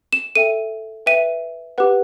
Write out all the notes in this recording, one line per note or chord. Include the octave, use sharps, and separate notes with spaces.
E7
A4 E5 G5 D#7
B4 E5 G5 D#7
G4 B4 F#5